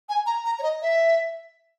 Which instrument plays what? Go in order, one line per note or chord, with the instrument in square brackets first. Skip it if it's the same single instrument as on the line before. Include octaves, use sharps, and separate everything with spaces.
[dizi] G#5
A#5
A#5
C#5
D#5
E5